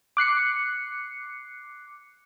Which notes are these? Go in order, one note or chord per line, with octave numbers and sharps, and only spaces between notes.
D6 F#6 C7 C#7